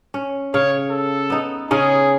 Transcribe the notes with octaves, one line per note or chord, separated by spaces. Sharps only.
C#4
C#3 C#5 F5
A4
B3 D#4
C#3 C#4 D#4 G#4